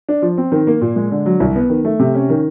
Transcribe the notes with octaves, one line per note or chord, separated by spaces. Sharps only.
D4
F3
C4
D#3
A#3
A#2
G#3
D3
F#3
C2
B3
D#3
A3
C3
C#4
D#3